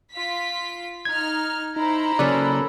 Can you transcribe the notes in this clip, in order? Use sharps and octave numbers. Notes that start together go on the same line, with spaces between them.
F4 B6
D#4 F6 G#6
D#4 E4 C5 A#5
C#3 F#3 A#3 C#4 A4 B4 D5